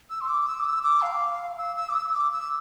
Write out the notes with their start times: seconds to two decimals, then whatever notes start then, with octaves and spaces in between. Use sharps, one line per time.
0.10 E6
0.21 C6
0.28 D6
0.46 E6
0.60 D6
0.65 E6
0.83 D6
1.02 F5
1.58 E6
1.76 E6
1.89 D6
1.95 E6
2.13 D6
2.32 E6